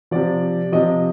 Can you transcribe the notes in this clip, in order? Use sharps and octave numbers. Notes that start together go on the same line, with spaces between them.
C3 F3 D5
C3 F3 D#5